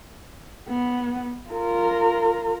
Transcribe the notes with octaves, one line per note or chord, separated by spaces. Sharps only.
B3
F4 A#4